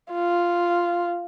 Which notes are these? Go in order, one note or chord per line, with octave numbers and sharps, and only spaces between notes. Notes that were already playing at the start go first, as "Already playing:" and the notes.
F4